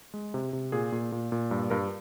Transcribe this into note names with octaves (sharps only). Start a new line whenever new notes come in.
G#3
C3
C3
A#2 G#4
A#2
A#2
A#2
G2
G2 A#4